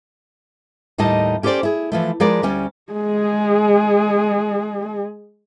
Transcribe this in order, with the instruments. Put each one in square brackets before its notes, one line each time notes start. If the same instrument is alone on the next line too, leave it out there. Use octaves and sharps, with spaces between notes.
[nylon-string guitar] D#2 A2 G3 D#4 D#5 A5
C#4 G4 A4 C5 D5
E4 G#4
E3 F3 A3
F3 G#3 G#4 A#4 B4 D5
D2 G3 C#4 G#5
[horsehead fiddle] G#3 G#4